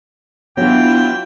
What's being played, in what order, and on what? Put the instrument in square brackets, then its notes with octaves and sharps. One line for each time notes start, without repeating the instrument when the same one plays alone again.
[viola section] E3 E4 F4 [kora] F#3 [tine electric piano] B3 D4 [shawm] G5